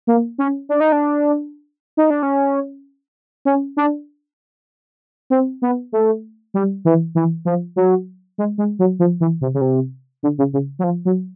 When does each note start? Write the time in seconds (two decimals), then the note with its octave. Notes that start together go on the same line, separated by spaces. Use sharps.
0.07 A#3
0.38 C#4
0.69 D4
0.80 D#4
0.92 D4
1.97 D#4
2.10 D4
2.23 C#4
3.45 C#4
3.77 D4
5.30 C4
5.62 B3
5.92 A3
6.54 G3
6.85 E3
7.15 E3
7.45 F3
7.76 F#3
8.38 G#3
8.58 G#3
8.79 F#3
8.99 F3
9.20 E3
9.41 C3
9.54 C#3
9.61 C3
10.23 D3
10.38 C#3
10.53 C#3
10.79 F#3
10.84 F3
11.05 F#3